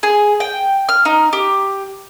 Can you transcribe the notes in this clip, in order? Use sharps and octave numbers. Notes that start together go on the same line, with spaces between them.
G#4
G5
F6
D#4
G4